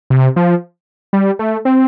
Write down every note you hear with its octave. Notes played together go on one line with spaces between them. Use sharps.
C3
F3
G3
A3
C4